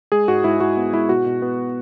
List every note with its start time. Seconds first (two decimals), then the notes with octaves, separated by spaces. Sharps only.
0.12 G#3 G#4
0.28 G#2 F#4
0.44 G#2 E4
0.60 G#2 F#4
0.77 B3
0.93 G#3 E4
1.09 B2 F#4
1.26 B2
1.42 B3